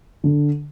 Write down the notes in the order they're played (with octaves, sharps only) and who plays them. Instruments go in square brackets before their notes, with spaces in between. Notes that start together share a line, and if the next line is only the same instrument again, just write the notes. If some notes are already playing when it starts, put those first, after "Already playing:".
[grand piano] D3